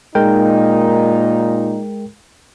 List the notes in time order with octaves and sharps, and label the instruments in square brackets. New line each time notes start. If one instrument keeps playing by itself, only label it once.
[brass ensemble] A#2 D#4 [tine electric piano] G#3 A#4 G5